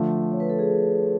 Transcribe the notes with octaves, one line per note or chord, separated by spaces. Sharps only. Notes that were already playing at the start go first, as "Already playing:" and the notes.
Already playing: D3 F3 A3
C#5
B4
A4
G#4